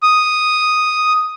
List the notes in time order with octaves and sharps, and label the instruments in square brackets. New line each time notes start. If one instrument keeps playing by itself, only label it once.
[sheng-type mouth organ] D#6